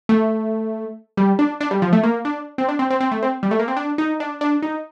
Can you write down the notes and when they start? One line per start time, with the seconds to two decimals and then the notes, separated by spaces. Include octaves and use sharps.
0.09 A3
1.17 G3
1.39 D4
1.61 D4
1.71 G3
1.82 F3
1.93 A3
2.03 A#3
2.25 D4
2.58 C4
2.68 D4
2.79 C4
2.90 C4
3.00 C4
3.11 A3
3.23 C4
3.43 G3
3.51 A3
3.59 A#3
3.68 C4
3.77 D4
3.98 D#4
4.20 D4
4.41 D4
4.63 D#4